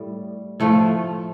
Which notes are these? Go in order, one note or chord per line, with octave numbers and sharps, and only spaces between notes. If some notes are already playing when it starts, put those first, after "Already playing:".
Already playing: A2 G3
A2 F3 A3